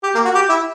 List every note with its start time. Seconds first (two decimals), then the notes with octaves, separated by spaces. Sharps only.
0.03 G4
0.15 A#3
0.25 F#4
0.35 G4
0.49 E4